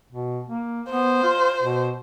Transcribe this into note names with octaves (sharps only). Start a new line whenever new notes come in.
B2
A#3
B3 C5
F4
B2